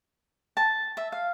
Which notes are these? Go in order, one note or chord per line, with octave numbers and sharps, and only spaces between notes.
A5
E5
F5